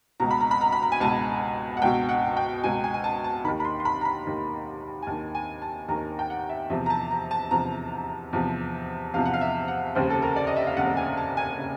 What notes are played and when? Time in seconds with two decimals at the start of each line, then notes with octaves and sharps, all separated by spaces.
0.20 C#2 B2 A#5
0.31 B5
0.41 A#5
0.51 B5
0.61 A#5
0.72 B5
0.83 A#5
0.92 G#5
1.00 C#2 B2 A5
1.77 F#5
1.82 C#2 B2 G5
2.09 F#5
2.37 G5
2.64 C#2 B2 G#5
2.84 G#5
2.94 G#5
3.04 A5
3.24 A5
3.44 D#3 B5
3.49 D#2
3.60 B5
3.65 C6
3.80 C6
3.85 B5
4.01 A#5
4.05 B5
4.27 D#2 D#3
5.02 G#5
5.07 D#2 A5
5.11 D#3
5.35 G#5
5.62 A5
5.88 D#2 D#3 A#5
6.19 G5
6.30 F#5
6.49 E5
6.70 E2 C3 F3 E5
6.86 A#5
6.90 A5
7.11 A#5
7.31 A5
7.51 E2 C3 F3 A#5
8.33 E2 C3 F3
9.14 E2 C3 F3 F5
9.26 F#5
9.34 F5
9.41 E5
9.68 F#5
9.95 F1 D#2 C#3 C5
10.10 A4
10.22 A#4
10.36 D5
10.47 D#5
10.56 E5
10.67 F5
10.77 F1 D#2 C#3 F#5
10.97 G#5
11.17 A5
11.37 G#5
11.59 C#3